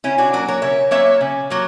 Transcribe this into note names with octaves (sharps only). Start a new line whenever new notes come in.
C#3 C#4 E4
D4 F#4
F#3 A#3 F#4 A#4
A#4 C#5
C#3 C#5 E5
F#3 A#3 C#5 E5
C#3
F#3 A#3